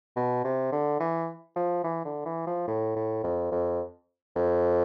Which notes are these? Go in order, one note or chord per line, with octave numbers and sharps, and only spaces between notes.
B2
C3
D3
E3
F3
E3
D3
E3
F3
A2
A2
F2
F2
F2